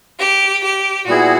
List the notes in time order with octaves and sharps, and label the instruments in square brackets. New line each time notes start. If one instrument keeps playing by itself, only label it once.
[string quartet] G4
G4
[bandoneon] A#2 G3 B3 E4 G#4 [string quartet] F#4